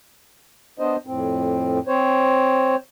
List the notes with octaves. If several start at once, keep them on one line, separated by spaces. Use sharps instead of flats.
B3 D4 C5 D#5
F2 A2 C4
C4 C5 C#5